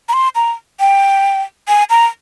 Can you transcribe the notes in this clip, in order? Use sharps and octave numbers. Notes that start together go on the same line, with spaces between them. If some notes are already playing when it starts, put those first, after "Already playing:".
A#5
C6
A#5
G5
G#5
A#5